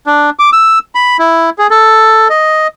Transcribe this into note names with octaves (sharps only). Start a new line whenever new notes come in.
D4
D6
E6
B5
E4
G#4
A4
D#5